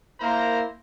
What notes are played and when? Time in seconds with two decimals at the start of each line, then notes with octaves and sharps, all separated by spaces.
0.20 A#3 E4 A#4 C5 A#5